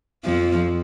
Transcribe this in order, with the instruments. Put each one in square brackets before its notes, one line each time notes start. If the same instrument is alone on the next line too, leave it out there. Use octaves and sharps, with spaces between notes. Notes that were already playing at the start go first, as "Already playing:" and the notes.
[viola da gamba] F2 F3